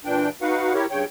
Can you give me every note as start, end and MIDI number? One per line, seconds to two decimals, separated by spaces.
0.05 0.29 46
0.05 0.29 52
0.05 0.29 62
0.05 0.29 79
0.42 0.73 63
0.42 0.73 66
0.42 0.73 71
0.42 0.73 77
0.42 0.73 78
0.74 0.86 64
0.74 0.86 67
0.74 0.86 70
0.74 0.86 73
0.91 1.05 43
0.91 1.05 49
0.91 1.05 73
0.91 1.05 79